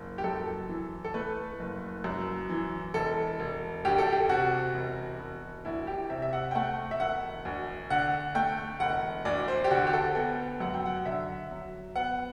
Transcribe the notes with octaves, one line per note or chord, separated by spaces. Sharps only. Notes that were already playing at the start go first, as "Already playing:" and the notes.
Already playing: F#1
G4
F#2 A4
E3
A4
A3 B4
F#1
F#2
E3
E1 A4
E1
D2 G4
A4
G4
C3 F#4
E1
E1
D2 E4
G4
C3 E5
E5
F#5
G5
A3 F#5
E5
E1 F#5
D2
D3 F#5
A3 G5
E1 F#5
D2 D5
C5
G4
D3 F#4
G4
A4
B3 G5
F#2 F#5
G5
F#5
D3 E5
F#3
B3 F#5